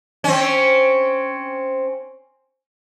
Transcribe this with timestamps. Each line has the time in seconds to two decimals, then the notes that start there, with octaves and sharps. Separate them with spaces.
0.24 C4 C#4